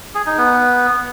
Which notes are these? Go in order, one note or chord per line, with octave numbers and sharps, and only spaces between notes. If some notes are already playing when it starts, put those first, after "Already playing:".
G#4
D#4
B3